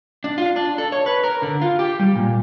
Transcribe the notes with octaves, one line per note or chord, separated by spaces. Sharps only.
D4
F4
D4
A4
C#5
B4
A#4
D3
F4
G4
G3
A#2